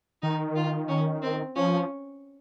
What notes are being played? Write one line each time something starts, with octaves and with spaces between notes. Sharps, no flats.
D#3 D#4
F4
C#4
C4
F3 C#4